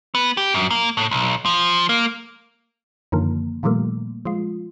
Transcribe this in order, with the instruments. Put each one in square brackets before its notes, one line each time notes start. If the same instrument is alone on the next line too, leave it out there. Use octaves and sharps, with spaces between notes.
[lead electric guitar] B3
G4
F#2
A#3
A2
B1
F3
A#3
[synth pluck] F#2 D3 D#3 F3 A#3
A#2 D#3 F3 G3 A3 A#3
F3 G#3 F4